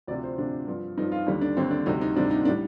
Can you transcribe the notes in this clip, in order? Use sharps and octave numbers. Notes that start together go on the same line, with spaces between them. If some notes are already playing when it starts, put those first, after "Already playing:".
D2 C3 F3 D5
C5
D2 C3 F3 D4
G2 F3
G2 F3 D#4
F4
D#2 D3 G3
D4
D#2 D3 G3 C4
D4
D2 C3 G3 D#4
D#4
D2 C3 G3 D4
D#4
A2 G3 D4